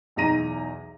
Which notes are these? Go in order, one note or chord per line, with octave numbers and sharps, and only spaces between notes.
B1 E2 D#4 A#5 A#6 D#7